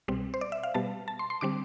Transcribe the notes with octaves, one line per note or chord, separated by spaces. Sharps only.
C2 B2 G3 C4
C5
D5
E5
F5
B2 G3 B3 A5
A5
C6
C6
D3 G3 C4 D6